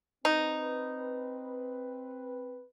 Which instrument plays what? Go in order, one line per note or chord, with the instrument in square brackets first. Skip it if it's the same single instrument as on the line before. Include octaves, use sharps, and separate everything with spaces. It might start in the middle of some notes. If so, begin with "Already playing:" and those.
[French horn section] C4 B4 [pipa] D#4